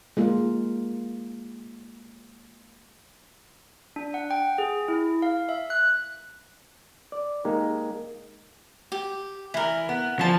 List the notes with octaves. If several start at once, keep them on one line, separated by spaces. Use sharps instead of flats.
G#3 A#3 F4
D4
F#5
G5
G#4
E4
F5
E5
F#6
D5
G#3 A#3 D#4 G4
G4
E3 E4 A#4
B3
E3 F3 A5